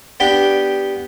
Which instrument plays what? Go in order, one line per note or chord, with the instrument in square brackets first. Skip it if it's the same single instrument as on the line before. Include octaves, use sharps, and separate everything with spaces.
[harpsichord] B3 D4 G4 G5